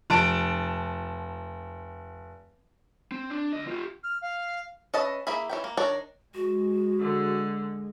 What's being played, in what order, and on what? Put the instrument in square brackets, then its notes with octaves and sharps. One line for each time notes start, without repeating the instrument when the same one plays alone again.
[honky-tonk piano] F1 A5 D7
[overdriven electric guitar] C4
D4
D2 D#5
F4 G4
[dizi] F6
F5
[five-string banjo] C#4 B4 D#5 E5 A5
A#3 E4 G#4 E5 B5
E3 C#4 G5
A#3
D#3 D4 A#4 C#5 A#5
[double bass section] G#3 [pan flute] F#4
[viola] D3